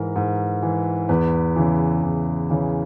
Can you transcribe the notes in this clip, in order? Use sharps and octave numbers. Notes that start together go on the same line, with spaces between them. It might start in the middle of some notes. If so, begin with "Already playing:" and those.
Already playing: G#2 E3 A#4
G#2
E3
E2 B4
C#3 E3
E2
C#3 E3